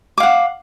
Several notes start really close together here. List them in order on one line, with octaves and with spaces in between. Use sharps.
D6 F5 F#5